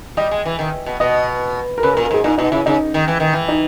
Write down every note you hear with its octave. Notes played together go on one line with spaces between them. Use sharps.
G3 D#5
G#3
E3
D#3
B2
B2 D#5
A#4
C#3 B4
A#4
A#2
A#4
G#2 G#4
A#2 D#4
B2 D#4
C#3 E4
C#3 D#4
D#3
E3
D#3
E3
D#4